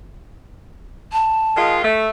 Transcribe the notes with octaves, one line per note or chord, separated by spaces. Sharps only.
A5
D#3 G#3 F4
A3